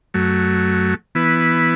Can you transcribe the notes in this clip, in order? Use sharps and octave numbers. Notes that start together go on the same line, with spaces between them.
F#2 F#3 A3
E3 B3 E4 B4